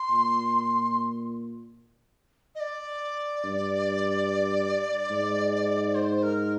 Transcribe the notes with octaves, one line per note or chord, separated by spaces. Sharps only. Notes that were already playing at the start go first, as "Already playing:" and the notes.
Already playing: C6
A#2
D#5
D5
G2
G#2
C5
A#4